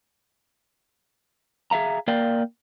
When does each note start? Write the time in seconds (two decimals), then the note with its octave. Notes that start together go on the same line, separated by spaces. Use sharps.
1.71 G#4 E5 F5 A#5
2.08 A#3 A#4 D5 F5 G5